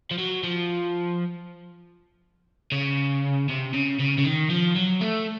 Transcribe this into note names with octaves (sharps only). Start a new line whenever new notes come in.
F3
F#3
F3
C#3
C3
C#3
C#3
C#3
D#3
F3
F#3
A3